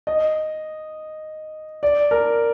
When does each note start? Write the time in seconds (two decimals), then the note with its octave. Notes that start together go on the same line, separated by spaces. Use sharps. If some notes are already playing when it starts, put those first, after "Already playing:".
0.07 D#5
1.83 D5
2.11 A#4